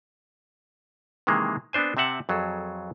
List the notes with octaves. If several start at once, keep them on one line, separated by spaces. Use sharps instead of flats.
C3 D#3 E3 G#3 A#3
B3 C4 D4 C5 G#5
C3 C4 E5 F#5 A5
F2 F#3 G#4 A4